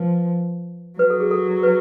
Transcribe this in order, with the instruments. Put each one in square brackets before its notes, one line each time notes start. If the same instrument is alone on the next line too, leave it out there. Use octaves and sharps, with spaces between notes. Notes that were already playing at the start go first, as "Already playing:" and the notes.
Already playing: [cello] F3 [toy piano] B4
[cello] F#3 [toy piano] B4
[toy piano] A4
G#4
A4
B4